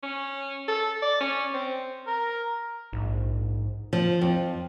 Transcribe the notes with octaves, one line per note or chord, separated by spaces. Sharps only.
C#4
A4
D5
C#4
C4
A#4
A#1 G#2
F3
F2